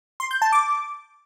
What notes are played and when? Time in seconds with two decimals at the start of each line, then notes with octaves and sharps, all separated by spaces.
0.20 C6
0.31 G6
0.42 A5
0.52 D6